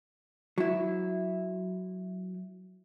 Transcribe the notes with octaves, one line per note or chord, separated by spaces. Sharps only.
F#3 E4